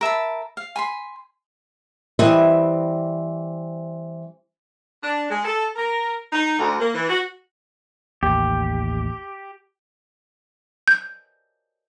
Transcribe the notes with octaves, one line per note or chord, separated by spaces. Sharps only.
A#4 E5 A5 B5
F5
G#5 B5 C6
E3 G3 C4 B4 D#5 E5
D4
G#3
A4
A#4
D#4
D2
A#3
E3
F#4
A1 D#2 G4
G6